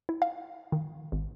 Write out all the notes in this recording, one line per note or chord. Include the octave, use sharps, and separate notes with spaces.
E4
F5
D#3
G#1